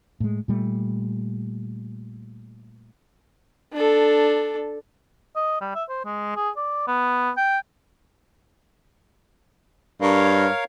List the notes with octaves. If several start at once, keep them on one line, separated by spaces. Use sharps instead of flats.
A2 G#3
A#2 G3 A3
D4 A4
D#5
G3
E5
C5
G#3
G#4
D5
B3
G5
G2 A#4 C#5 F5